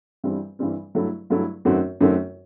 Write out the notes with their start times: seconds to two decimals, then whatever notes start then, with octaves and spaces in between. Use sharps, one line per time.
0.24 G2 E3 G3 C4
0.59 G2 E3 G3 C4
0.95 G2 F#3 A3 E4
1.30 G2 F#3 A3 E4
1.65 F#2 D#3 A3 C4 F#4
2.00 F#2 D#3 A3 C4 F#4